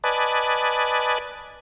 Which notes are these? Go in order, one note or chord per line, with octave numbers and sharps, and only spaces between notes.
B4 D5 D#5 G#5 A5 F#6